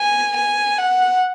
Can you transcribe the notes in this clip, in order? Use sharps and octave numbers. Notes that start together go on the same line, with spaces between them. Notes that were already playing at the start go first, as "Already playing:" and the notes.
Already playing: G#5
G#5
F#5